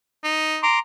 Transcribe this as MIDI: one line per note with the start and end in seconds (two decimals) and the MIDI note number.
0.24 0.60 63
0.63 0.79 82
0.63 0.79 84
0.63 0.79 86